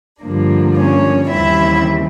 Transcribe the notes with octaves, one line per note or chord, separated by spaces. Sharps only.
G2 D3 F3 A#3 D4
C#4 C#5
D#2 C#3 E3 G3 C4 E4 E5